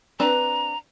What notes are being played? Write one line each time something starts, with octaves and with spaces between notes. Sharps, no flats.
C4 D4 B4 A#5